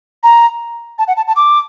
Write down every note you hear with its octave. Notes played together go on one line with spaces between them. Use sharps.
A#5
A5
F#5
A5
A5
D6